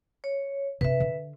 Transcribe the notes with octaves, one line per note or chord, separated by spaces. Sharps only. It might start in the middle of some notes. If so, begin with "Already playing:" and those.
C#5
C3 D4 B4 E5
D3